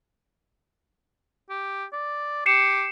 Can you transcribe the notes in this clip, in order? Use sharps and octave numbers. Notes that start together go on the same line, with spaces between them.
G4
D5
G4 C7 C#7 E7